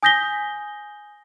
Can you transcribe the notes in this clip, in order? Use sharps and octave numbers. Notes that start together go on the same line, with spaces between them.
G#5 D#6 G6 A#6 B6 G7